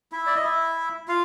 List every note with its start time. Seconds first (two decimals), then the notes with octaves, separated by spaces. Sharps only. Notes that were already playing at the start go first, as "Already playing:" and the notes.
0.12 E4 E5
0.26 D5
0.36 D#5
0.44 E4 E5
1.08 F4 F5